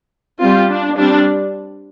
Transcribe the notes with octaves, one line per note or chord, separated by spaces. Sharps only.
G3 C4 F4
D4
G3 C4 D4